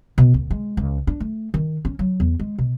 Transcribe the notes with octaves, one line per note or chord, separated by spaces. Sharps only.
B2
D2
G#3
C#2
D4
A3
D#3
C#4
F#3
E2
G#3
B2